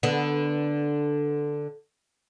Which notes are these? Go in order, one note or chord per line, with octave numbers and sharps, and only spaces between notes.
D3 B3